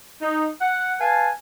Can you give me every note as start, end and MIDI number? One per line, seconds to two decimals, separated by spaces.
0.21 0.46 63
0.60 0.93 78
0.99 1.28 71
0.99 1.28 77
0.99 1.28 80
0.99 1.28 81